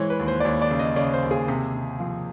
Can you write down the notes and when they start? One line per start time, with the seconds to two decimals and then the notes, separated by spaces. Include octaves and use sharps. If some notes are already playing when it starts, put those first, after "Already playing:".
Already playing: E3 G#3 C5 C#5
0.10 B4
0.19 D#2
0.28 C5
0.40 D5
0.45 D#2 C#5
0.62 D5
0.71 C#3
0.79 D#5
0.96 C#3 D5
1.14 C5
1.23 D#2
1.31 G#4
1.48 C3
1.74 C3
2.00 F3